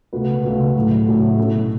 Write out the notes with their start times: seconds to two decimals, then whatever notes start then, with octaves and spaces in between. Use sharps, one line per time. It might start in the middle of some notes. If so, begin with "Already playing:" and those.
0.13 C#2 B2 A3 F#4 B4
0.43 C#2 B2 A3 F#4 B4
0.75 A2 F#3 A3
1.06 A2 F#3 A3
1.38 B2 A3 C#4 E4 A4